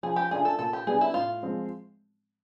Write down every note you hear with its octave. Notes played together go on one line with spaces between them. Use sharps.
F3 G#4
G4
A3 D4 F4 G#4
A4
A#2 A4
G4
G3 B3 D4 G#4
E4
A2 F4
F3 G#3 C4